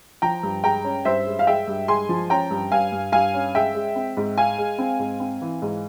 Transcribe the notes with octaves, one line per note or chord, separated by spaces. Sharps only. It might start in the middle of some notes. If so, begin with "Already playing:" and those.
F3 G5 A#5
G2
G#3 G5 A#5
C#4
G2 C5 E5
G#3
F5
G#3 E5 G5
G2
G#3 G#5 C6
F3
C#4 G5 A#5
G2
G2 F5 G#5
G2
G2 F5 G#5
C#4
G#3 E5 G5
G#3
C4
G#2
G#3 F5 G#5
G#3
C4
G#2
C4
E3
G#2